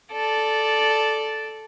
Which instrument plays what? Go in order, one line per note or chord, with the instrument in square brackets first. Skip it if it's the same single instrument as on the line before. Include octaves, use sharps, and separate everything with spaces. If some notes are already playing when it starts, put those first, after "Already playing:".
[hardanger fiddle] A4 D5